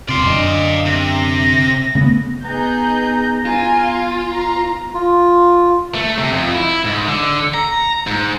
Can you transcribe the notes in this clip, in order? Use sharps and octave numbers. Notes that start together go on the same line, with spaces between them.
E1 C3 D5 F5 C6
F#2 D3 D#5
C3 A#6
C#3 A3 B3
B3 D#4 G#4 A#5 G6
F4 G#5
A#5
F4
A3
C3
F2
E4
G#2
D3
A#5
G#2